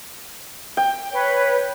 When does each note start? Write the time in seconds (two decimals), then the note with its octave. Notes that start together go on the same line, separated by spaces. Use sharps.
0.77 G5
1.12 B4 C#5